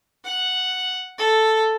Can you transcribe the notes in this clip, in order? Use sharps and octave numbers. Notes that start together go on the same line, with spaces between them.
F#5
A4